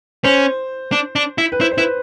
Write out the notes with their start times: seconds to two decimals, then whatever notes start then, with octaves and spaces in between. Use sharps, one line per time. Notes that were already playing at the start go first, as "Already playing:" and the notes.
0.24 C#4 C5
0.92 D4
1.16 D4
1.38 E4
1.52 B4
1.61 E4 C5
1.71 C5
1.78 E4 B4